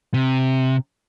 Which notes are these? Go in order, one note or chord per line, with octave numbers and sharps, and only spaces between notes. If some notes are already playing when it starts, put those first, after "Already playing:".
C3